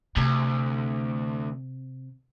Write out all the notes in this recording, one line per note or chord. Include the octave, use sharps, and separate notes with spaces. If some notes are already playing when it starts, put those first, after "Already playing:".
D2 C3